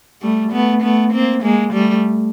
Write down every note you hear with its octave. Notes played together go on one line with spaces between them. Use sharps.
G3 A3
A3 B3
A3 B3
A#3 C4
G#3 A#3
G3 A3